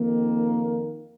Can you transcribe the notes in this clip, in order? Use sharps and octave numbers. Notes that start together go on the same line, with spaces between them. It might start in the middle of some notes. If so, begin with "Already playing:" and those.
Already playing: F2 D#3 A#3